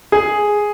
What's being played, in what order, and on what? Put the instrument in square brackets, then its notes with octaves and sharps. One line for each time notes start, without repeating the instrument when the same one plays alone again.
[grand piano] G#4